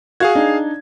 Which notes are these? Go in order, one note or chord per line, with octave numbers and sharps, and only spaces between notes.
F#4 G#4 F5 G#6
D4 D#4